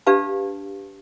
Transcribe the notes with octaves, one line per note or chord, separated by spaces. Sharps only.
D4 G4 B4 F5 A5